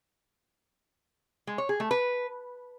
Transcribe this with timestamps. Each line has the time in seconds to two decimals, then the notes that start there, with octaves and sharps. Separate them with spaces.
1.47 G#3
1.58 C#5
1.69 G#4
1.80 A3
1.91 B4